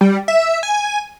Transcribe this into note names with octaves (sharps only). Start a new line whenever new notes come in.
G3
E5
G#5